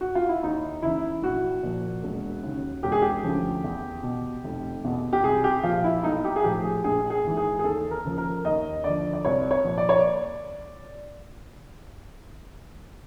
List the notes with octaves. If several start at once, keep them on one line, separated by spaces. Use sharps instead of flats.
F#4
F4
E4
D#2 D#4
C#3 E3 E4
A#1 F#4
A#2 F3
E1
D#2 C#3
E1 G4
G#4
G4
D2 C#3 F3
E2
B2
F1
E2 B2
G4
C2 G#4
G4
A#2 F3 F4
E4
B1 D#4
G4
G#4
A2 F3 G4
G#4
A#1 G#4
G#4
G#2 E3
G#4
G#4
D#2 A4
A#4
C#3 F3
A#4
D#2 D#5
D3 F3 D5
D5
C2 C#5
C#5
A#2 F3
D5
C#5
D5